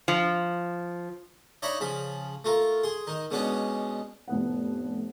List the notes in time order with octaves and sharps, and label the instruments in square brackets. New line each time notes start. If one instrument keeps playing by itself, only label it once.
[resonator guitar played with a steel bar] F3
[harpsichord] D4 D#4 C#5 E5 A#5 B5
C#3 F3 B5
A3 F4 A#4
G#4 C6
D#3 D#4
B2 G#3 B3 C#4 D4
[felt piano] F1 A2 B3 F#5